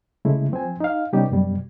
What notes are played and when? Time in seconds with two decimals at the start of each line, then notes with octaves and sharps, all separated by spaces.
0.25 C#3 G#3 A3 E4
0.52 F3 C4 C5 G#5
0.80 D#4 F5
1.13 C3 G3 B3 C#4 D#4 G4
1.30 F#2 B2 G3